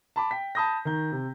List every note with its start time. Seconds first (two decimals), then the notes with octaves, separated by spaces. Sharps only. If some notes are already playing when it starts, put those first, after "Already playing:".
0.16 A5 B5 D6
0.31 G5 B6
0.55 A5 B5 D#6 G6 A#6
0.85 D#3 A#5 G6
1.12 C3